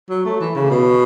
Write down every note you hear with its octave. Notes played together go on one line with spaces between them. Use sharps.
F#3
A3
E3
C#3
B2